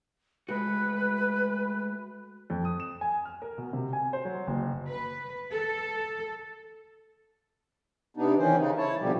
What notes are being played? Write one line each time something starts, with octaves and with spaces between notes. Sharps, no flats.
G#3 A3 F#4 B4
F2
D#6
E7
G#5
F6
A#4
B2
C3
G#5
C5
F#3
F#1
B4
A4
C3 B3 D4 D#4
D#3 E3 C#4 C5
C#3 D#4
E4 C#5 A5
B2 D3 F3 G3 G4